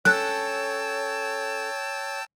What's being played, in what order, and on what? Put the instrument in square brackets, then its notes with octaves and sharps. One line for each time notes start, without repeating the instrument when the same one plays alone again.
[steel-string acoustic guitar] C#4 A4 [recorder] C#5 [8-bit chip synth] G5 A5 E6 [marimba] F#6